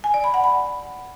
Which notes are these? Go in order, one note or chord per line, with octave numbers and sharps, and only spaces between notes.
G#5
D5
B5
F#5
B5